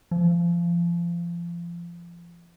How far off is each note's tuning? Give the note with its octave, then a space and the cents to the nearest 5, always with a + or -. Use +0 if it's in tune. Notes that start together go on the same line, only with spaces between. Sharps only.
F3 -30